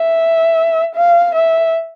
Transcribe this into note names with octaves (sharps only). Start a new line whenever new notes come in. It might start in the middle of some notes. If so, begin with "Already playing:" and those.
Already playing: E5
F5
E5